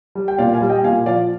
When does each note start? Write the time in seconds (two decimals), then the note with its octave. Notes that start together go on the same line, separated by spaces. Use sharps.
0.15 G3
0.28 G5
0.38 A#2 D5 F5
0.54 F5 G#5
0.61 G3
0.69 D#5 G5
0.84 A#2 F5 G#5
1.06 F3 D5 F5